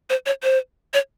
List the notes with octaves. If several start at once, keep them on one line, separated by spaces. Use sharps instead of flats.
C5
C#5
C5
C#5